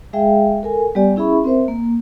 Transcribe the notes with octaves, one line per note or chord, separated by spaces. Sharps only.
G#3 G#4 E5 F5 G5
A4 A#4 G#5
G3 B3 G4 D5 G#5
C#4 E4 G#4 E5 B5 C#6
C4 A#4 C5 E5
A#3